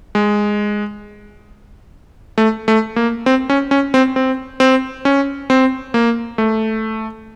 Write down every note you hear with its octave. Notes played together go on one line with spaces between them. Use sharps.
G#3
A3
A3
A#3
C4
C#4
C#4
C4
C4
C4
C#4
C4
A#3
A3